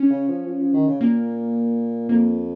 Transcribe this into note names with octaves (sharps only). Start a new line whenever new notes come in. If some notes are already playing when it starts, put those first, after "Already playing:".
Already playing: C#4
C#3
F3
F3
F3
D#3
C#3
A#2 A#3
F2 A#3